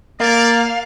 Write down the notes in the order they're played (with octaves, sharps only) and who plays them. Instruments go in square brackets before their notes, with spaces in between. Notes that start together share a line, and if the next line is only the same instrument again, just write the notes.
[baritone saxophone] A#3 [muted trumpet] D5 [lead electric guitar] F5